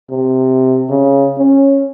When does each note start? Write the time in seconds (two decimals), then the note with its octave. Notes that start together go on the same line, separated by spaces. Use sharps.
0.10 C3
0.90 C#3
1.38 C#4